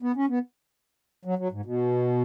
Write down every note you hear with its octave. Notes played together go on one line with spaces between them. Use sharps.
B3
C#4
B3
F#3
F#3
G#2
B2